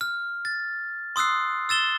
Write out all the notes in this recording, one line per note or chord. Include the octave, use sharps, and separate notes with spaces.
F6
A6
C6 D#6 E6 F#6 C7
E6 A6 E7 G7